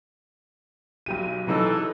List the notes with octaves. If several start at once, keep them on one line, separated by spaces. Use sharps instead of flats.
B1 G4 D#7
C3 E3 F#3 D#4 G#4 A4